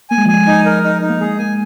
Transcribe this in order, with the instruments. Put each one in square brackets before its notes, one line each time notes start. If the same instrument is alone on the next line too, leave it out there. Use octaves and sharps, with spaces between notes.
[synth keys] A#3 [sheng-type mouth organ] G#5
[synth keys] G#3
F3
[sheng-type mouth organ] G#5
[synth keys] G#3
[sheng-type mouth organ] D#4
A#4
D#4
D#4
[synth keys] A#3
[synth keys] G#3 [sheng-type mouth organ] G#4
[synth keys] A#3 [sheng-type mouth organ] G#5